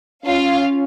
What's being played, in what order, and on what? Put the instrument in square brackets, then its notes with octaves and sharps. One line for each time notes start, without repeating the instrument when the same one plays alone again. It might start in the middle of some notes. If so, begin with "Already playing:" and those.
[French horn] C#4 [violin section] F4 F5